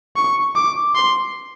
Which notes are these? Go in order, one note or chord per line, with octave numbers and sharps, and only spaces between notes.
C#6
D6
C6